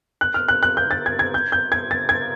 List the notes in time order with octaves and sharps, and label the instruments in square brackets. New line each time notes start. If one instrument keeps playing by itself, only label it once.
[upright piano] F#6
F6
F#6
F#6
G6
A6
G#6
G#6
G6
G6
G#6
A6
G#6